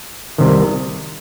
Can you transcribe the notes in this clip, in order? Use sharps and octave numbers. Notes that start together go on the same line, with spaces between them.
C2 C3 D#3